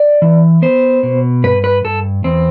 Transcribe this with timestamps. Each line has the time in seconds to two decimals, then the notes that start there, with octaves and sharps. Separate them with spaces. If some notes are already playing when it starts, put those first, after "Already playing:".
Already playing: D5
0.22 E3
0.62 B3 C5
1.03 B2
1.44 G2 B4
1.64 B4
1.84 G2 A4
2.24 E2 C4